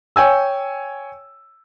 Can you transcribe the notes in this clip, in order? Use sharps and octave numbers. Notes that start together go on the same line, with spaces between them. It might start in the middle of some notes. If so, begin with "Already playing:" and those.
C#5 G5 G#5 E6